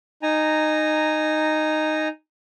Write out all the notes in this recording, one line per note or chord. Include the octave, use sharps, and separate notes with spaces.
D#4 G#5 A#5